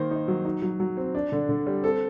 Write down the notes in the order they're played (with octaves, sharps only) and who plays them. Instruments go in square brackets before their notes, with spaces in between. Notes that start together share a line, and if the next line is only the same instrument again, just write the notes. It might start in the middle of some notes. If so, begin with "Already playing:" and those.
Already playing: [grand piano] D#3 A#3 C5
D#4
F#3
D#4
F#3
F#3
C4
D4
D3
D3
G3
C4 A4